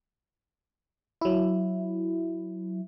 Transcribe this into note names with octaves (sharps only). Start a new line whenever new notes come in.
F#3 E4